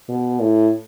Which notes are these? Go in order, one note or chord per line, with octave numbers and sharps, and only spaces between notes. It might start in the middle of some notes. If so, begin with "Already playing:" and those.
B2
A2